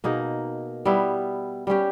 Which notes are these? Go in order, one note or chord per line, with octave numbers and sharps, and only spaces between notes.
B2 A#3 D#4 G#4
G3 B3 E4
G3 C#4 G4